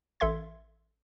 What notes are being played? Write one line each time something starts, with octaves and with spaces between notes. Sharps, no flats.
A1 A4 E5 C6 G#6